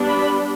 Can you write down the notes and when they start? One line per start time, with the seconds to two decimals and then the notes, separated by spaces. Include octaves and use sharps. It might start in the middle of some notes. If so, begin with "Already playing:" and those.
Already playing: G3 B3 D4
0.09 B5